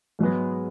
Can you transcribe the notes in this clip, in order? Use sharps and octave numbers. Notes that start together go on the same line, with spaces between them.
G#2 F#3 G#3 B3